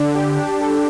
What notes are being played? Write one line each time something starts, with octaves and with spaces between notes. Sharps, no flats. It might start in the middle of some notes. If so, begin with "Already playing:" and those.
Already playing: D3 D4
G4
D4
A4